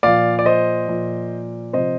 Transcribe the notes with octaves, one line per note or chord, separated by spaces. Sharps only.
A#2 F3 D5 F5
D5
C5 D#5
A#2 F3
C3 F3 C5 D#5